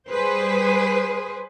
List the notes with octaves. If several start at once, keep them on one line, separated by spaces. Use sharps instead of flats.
G3 G#4 B4 C5